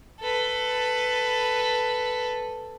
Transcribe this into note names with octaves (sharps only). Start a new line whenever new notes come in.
A4 B4